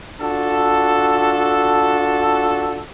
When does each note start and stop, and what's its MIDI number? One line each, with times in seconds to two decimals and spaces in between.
0.21 2.81 62
0.21 2.81 65
0.21 2.81 66
0.21 2.81 69